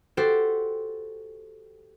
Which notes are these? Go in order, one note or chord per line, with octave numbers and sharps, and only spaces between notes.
F#4 G4 A4 C5